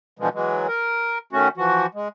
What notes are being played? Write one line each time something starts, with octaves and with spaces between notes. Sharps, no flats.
B2 D3 E3 F3 G#3
E3 F#3 G#3
A#4
D#3 A3 C#4 F#4
E3 F3 F#4
G#3